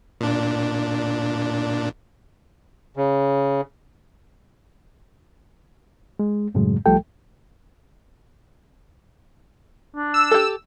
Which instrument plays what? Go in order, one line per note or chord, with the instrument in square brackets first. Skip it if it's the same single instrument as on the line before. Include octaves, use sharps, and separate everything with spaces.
[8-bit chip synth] A#2 D4
[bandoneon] C#3
[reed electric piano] G#3
F#2 A2 C#3 F#3 G#3
C2 F3 G3 A3 A4 G5
[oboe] D4
[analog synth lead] E6
[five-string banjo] G4 A4